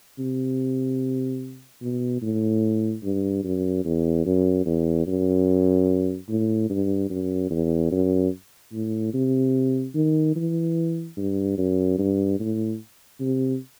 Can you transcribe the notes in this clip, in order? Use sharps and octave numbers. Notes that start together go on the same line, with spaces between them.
C3
B2
A2
G2
F#2
E2
F#2
E2
F#2
A2
G2
F#2
E2
F#2
A2
C3
D#3
E3
G2
F#2
G2
A2
C3